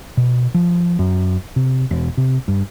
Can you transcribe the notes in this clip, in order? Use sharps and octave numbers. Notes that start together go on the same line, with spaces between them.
B2
F3
F#2
C3
E1
C3
G2